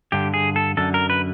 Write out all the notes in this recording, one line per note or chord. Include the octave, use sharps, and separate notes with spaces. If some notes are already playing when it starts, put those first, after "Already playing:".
G2 D3 G4
G#4
A4
F#2 D3 A4
A#4
B4